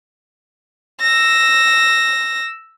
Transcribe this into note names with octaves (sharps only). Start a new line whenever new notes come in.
E6 A#6